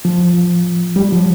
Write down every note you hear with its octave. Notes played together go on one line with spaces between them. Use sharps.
F3
G3
F3